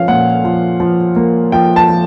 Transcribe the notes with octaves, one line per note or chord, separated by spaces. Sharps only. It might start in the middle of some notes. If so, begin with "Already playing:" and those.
Already playing: F3 C#4 F5
A#2 F#5
F3
F3
A#3
F3 G5
A5
F3